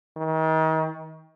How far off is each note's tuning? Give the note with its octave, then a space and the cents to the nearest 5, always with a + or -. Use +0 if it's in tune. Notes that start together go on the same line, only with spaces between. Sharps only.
D#3 +35